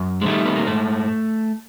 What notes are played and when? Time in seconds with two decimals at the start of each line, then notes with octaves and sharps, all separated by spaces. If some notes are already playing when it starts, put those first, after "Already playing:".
Already playing: F#2
0.21 G#3
0.26 D#3 G3 A3
0.45 B3
0.56 A#3
0.66 G#2 A3